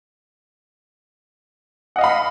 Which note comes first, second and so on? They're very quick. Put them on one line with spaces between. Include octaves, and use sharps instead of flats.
F#5 D#5 F5 B5